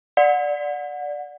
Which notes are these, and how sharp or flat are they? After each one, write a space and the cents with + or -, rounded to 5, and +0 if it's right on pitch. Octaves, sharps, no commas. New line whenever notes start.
D5 +0 F#5 -25